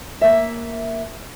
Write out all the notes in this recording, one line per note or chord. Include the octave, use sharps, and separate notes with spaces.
A#3 E5